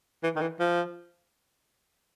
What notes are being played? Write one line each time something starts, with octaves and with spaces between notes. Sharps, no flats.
E3
D#3
E3
F3